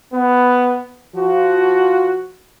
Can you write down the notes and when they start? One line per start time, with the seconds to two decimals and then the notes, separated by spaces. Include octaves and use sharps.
0.14 B3
1.15 F3 F#4